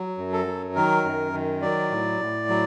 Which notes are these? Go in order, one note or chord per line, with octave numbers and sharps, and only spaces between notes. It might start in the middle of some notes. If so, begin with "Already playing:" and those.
Already playing: F#3
F#2
A4
F#3
D#3 A#4
F#2
D#3
F#3 D5
A2
A2
F#3